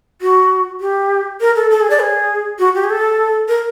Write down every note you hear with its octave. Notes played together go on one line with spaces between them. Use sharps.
F#4
G4
A#4
A4
A4
G#4
D5
G#4
F#4
G4
G#4
A4
A#4